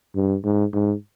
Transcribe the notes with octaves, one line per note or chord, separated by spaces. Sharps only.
G2
G#2
G#2